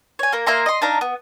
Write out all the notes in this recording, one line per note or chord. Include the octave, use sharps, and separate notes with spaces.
C#5 G#5
A#3 A#4
A#3 E5 A#5 C6
D#5 C6
D4 D#4 F5 A#5
B3